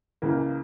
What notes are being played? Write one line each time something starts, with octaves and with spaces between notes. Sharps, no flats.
C#2 C#3 E3 A#3